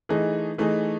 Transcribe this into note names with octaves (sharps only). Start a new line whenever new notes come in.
E3 A3 D#4 G#4
E3 A3 D#4 G#4